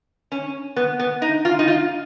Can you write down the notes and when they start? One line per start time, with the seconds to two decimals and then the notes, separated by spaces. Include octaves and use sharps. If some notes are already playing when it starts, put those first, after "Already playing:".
0.32 C#4
0.76 B3
0.99 B3
1.22 D#4
1.45 F4
1.59 D#4
1.67 F4